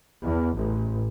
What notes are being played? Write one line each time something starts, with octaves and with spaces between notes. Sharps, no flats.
E2
A1